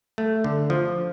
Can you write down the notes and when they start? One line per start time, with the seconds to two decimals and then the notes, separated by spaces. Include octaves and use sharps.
0.18 A3
0.44 D3
0.70 F3